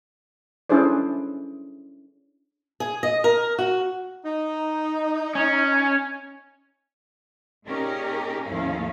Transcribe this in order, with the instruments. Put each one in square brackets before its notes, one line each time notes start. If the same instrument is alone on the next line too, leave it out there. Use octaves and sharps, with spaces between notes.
[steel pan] C#4 D4 E4 G#4 C5 D5
[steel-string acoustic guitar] G#4
D#5
A#4
F#4
[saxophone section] D#4
[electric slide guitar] C#4
[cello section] A#2 C#4 D#4 G4 G#4 A#4
D#2 A2 F3 C#4 E4 F5